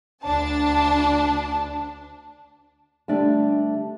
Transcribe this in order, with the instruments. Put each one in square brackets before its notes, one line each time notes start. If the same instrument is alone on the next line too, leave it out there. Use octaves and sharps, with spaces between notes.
[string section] D2 D4 A5
[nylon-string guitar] D3 G3 A3 D4 E5 A5